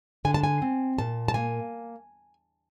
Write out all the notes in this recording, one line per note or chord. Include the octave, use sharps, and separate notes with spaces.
D3 G#5
A5
G#5
C4
A#2 A5
A5
A#3 G#5